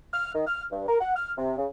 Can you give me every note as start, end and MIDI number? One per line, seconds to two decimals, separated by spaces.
0.13 0.30 89
0.34 0.45 51
0.46 0.64 89
0.71 0.87 43
0.87 0.95 70
1.00 1.12 78
1.16 1.31 89
1.38 1.58 48
1.58 1.66 49